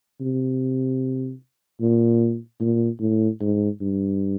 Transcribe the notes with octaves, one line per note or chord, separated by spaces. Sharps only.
C3
A#2
A#2
A2
G#2
G2